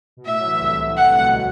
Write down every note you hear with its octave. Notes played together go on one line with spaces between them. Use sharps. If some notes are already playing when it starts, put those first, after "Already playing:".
B2
A2 E5
F#3
E3
D3
C2 C3
C3
D2 D3 F#5
C3
B2